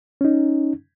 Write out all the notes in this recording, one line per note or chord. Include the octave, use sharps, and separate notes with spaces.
C#4 D#4